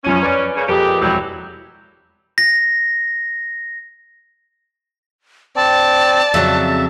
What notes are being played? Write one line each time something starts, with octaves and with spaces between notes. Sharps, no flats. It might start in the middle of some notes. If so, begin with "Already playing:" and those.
F#2 F3 C#4 D#7
B4 D5
C#3 A#3 C#4
F2 A#2 G#3 G4 A4 B4
E1 F2 F#3 G3 E4
A#6
C4 D5 A5
F2 C#3 F#3 E5